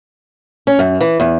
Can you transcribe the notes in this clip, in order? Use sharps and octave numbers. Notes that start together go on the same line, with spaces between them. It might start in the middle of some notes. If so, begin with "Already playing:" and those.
C#4
F#2
E3
E2